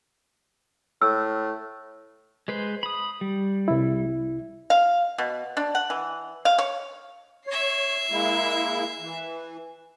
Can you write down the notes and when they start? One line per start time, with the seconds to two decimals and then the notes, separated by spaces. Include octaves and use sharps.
1.02 A2 E6
2.48 G#3 B4 C5
2.83 B5 D#6
3.21 G3
3.68 C2 E4
4.70 F5
5.18 B2
5.57 D4
5.75 F#5
5.90 E3
6.45 F5
6.58 C#5
7.47 C#5 E5 C7
8.11 G#3 A#3 E4
9.00 E3